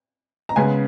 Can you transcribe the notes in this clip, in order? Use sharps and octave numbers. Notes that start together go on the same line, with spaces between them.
A#5
C#3 G#3 B3 G#5